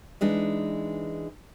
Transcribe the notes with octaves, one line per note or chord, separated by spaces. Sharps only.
E3 G#3 D4 D#4